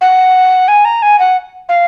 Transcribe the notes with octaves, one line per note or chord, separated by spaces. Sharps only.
F#5
G#5
A#5
G#5
F#5
F5